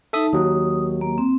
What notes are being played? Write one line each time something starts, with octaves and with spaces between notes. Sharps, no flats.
D#4 A4 E5 A5 D#6
D#2 F#3 D#6
A#3
C4